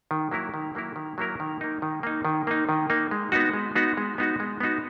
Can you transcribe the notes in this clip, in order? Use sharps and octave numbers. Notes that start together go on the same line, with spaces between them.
D#3
F#3 A#3 E4 A#4
D#3
F#3 A#3 E4 A#4
D#3
F#3 A#3 E4 A#4
D#3
A#3 D#4
D#3
A#3 D#4
D#3
A#3 D#4
D#3
A#3 D#4
G#3
B3 D#4 F#4
G#3
B3 D#4 F#4
G#3
B3 D#4 F#4
G#3
B3 D#4 F#4